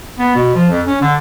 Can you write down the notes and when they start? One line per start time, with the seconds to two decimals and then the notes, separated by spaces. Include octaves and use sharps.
0.19 B3
0.35 B2
0.54 F3
0.69 F2
0.86 C#4
1.01 D3